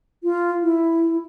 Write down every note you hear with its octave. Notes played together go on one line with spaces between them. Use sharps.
F4
E4